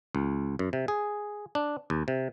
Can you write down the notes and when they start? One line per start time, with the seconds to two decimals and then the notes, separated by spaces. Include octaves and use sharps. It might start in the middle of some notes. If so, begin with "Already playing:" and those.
0.15 C#2
0.59 F#2
0.73 C3
0.88 G#4
1.55 D4
1.90 D#2
2.08 C3